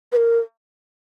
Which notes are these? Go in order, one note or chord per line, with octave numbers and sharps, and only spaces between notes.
B4
A#4